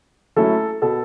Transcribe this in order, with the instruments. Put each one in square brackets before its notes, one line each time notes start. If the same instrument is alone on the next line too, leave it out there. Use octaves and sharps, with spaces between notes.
[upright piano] F#3 A3 C#4 E4 [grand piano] A4
[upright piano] B2 [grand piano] A4